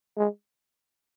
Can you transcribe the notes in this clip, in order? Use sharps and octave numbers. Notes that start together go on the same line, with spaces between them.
G#3